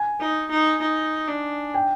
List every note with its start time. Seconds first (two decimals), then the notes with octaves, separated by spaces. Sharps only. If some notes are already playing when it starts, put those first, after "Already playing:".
Already playing: G#5
0.20 D#4
0.51 D#4
0.82 D#4
1.28 D4
1.74 G5